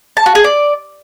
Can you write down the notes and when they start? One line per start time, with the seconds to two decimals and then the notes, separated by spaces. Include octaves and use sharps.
0.17 A5
0.26 F#4
0.35 G#4
0.44 D5